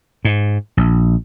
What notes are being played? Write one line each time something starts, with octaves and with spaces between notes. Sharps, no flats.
G#2
A#1